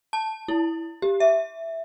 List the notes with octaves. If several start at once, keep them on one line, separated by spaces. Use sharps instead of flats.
A5
E4
G4
E5